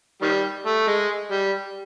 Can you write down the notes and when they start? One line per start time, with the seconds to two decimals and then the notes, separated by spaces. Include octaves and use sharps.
0.22 D#3 G3
0.66 A3
0.87 G#3
1.32 G3